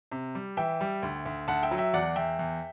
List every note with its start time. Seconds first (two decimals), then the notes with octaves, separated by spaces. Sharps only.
0.12 C3
0.35 G3
0.57 E3 E5 G5
0.81 G3
1.03 D2
1.26 D2
1.48 D2 F#5 A5
1.63 E5 G5
1.71 F#3
1.78 E5 G5
1.93 E2 D5 F#5
2.16 E2 E5 G5
2.39 E2